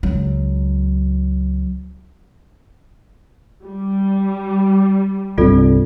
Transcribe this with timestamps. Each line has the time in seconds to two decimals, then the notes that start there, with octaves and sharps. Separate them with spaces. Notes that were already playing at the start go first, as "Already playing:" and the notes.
0.03 C#2 F#3
3.64 G3
5.38 C2 G2 C3 F4 A4 D5